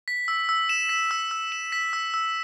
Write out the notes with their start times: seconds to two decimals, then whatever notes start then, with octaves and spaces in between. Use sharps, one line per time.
0.08 B6
0.28 E6
0.49 E6
0.69 E7
0.89 B6
1.11 E6
1.31 E6
1.52 E7
1.72 B6
1.93 E6
2.14 E6